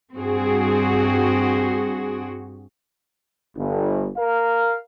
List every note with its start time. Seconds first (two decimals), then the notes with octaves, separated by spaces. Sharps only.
0.15 G2 C4 F#4 G#4
3.56 G1
4.17 A#4 F5